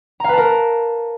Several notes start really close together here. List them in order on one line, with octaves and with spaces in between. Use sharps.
A#5 F5 B4 A5 A#4